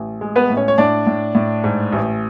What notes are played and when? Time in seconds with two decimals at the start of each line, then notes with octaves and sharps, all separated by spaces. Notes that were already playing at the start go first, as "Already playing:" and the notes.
Already playing: A1
0.21 G#3
0.36 B3 B4
0.50 A2
0.57 C#4 C#5
0.68 C#5
0.78 A2 D4 D5
1.07 A2
1.35 A2
1.64 G#2
1.93 A1